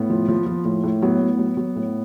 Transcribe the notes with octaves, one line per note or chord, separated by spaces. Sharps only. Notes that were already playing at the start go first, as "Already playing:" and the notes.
Already playing: A2 B3
F3
F3
F3
A2
A2
F#3 B3
A2
F#3
F#3
A2